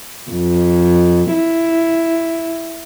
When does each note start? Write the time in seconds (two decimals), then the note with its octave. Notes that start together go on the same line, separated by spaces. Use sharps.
0.31 F2
1.33 E4